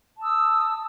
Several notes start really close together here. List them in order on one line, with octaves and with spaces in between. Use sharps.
A5 D#6 E6